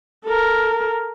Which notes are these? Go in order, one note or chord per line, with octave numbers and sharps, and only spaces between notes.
A4 A#4